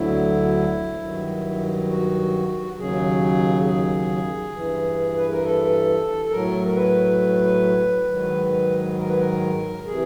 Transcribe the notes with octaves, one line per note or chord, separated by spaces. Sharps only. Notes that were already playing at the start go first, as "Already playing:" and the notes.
Already playing: D2 D3 F#3 E4
G2 D#3 F#3
F#4
D#2 C#3 F#3 G#4
G#4
G2 E3
B4
A#4
A4
A4
A2 F#3 A#4
A#4
B4
G#2 D#3 F#3
A#4
B4
A#4
C3 E3 G#4